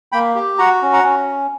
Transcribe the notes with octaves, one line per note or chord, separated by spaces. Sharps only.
A#3 G5 B5
G4
F#4 F#5 A#5
C#4
F#5 A#5
C#4